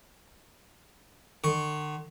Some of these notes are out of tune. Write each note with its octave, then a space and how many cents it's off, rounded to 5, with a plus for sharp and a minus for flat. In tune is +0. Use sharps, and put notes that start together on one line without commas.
D3 +45 C#6 +0